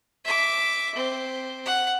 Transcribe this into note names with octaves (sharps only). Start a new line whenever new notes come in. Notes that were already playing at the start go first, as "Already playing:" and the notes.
E5 D6
C4
F#5